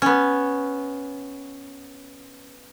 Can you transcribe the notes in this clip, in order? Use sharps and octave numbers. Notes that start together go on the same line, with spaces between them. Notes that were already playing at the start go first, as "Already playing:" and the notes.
B3 C#4